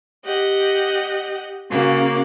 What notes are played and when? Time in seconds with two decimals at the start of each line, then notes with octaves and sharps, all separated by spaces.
0.25 G4 D#5 F#5
1.71 C#3 A#3 F#4